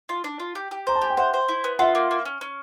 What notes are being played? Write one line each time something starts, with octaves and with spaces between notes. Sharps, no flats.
F4
D4
F4
G4
G4
C5 A#5
A5
G4 G#5
G5
C5 E5 F#5
C5
E4
B3
F4 E5 F#5
A#3
A#3
C#4
C#4